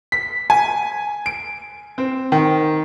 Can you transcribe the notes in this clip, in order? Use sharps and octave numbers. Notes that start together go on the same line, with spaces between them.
B6
G#5
D7
C4
D#3